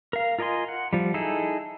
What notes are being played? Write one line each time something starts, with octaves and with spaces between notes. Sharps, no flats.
A#4 F5
F4 A#4 D#5 G#5 C6
F#5
F3 G3
D#4 E4 G#4 A4